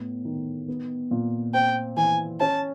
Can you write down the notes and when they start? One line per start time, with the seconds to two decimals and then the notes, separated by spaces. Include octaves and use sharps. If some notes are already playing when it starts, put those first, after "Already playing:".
Already playing: A2 B3
0.25 D#3
0.68 B3
1.11 A#2
1.54 C4 G5
1.97 E3 G#5
2.40 C#4 A5